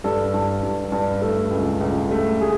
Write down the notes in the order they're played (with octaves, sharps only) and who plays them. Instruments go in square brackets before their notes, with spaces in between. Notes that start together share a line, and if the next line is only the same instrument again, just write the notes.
[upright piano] G2 A4
G2
G2
G2
A3 A4
C#2
C#2
A3
G#4